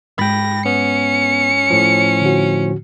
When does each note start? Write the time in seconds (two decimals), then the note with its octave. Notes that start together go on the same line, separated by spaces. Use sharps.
0.19 G#2 G#3 G5 B5 A#6
0.66 B3 C#4 C#7
1.70 A2 F3
2.22 D3 F#4